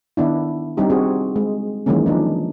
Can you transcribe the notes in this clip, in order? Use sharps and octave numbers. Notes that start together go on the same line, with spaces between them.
D#3 B3 D4 E4
G3 C4 D4 D#4 G4
C4 F#4 G#4
G#3
D#3 E3 F#3 G#3 A#3 C#4
F3 D4 D#4